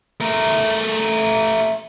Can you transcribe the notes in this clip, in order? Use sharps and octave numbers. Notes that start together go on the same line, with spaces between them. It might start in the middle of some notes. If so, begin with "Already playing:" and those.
A3 A#4